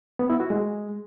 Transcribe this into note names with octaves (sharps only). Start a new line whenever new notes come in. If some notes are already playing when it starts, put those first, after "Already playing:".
B3
E4
F#4
G#3